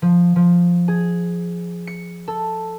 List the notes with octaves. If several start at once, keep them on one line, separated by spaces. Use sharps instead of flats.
F3
F3
G#4
C#7
A4